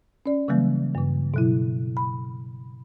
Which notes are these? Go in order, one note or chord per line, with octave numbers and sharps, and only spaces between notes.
C#4 D5
C#3 E3 F#3 G3 A#3
G2 C#3
B2 F#3 E4
B5